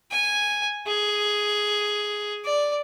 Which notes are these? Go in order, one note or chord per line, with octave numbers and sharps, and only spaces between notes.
G#5
G#4
D5